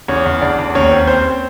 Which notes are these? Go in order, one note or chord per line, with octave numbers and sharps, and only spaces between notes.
E2 C#4 C#5
E2
E2 D4 D5
E2
D#2 C#4 C#5
C4
C4 C5